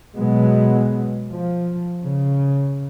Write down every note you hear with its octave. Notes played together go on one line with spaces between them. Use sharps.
B2 F#3 G#3 B3
F3
C#3